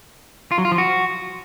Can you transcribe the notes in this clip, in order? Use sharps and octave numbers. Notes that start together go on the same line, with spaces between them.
F4
F#3
F4
F3
F#4